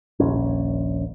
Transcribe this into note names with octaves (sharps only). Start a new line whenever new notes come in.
D#1 A#1 C#4